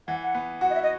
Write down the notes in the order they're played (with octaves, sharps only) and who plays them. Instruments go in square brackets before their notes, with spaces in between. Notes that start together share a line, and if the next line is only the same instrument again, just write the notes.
[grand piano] E3 [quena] F#5
[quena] F#5
[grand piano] B3
[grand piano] F#4 [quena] F#5
[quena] D#5
E5
D#5